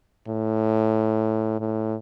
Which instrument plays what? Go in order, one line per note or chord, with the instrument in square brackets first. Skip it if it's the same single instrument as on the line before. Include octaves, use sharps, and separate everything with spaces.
[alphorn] A2
A2